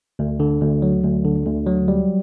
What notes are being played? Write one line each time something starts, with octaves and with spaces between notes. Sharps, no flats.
D2
D3
D2
F#3
D2
D3
D2
F#3
G3